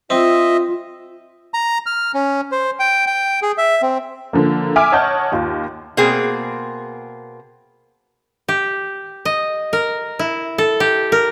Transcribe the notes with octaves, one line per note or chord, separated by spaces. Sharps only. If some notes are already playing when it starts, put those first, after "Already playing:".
C4 F4 D#5 E5
A#5
F6
C#4
C5
G5
G5
G#4
E5
C4
D3 F3 A#3
E5 G#5 D6 F6 D7
C#5 D#5 F#5 A5 G6
D#2 F4
B2 A#3 C4 G#4
G4
D#5
A#4
E4
A4
G4
A#4